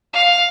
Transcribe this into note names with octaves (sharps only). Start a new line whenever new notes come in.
F5